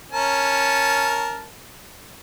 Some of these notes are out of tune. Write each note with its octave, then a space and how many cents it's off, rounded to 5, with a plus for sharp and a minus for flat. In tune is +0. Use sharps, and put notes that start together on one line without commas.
C#4 +0 A#4 +0 A5 -15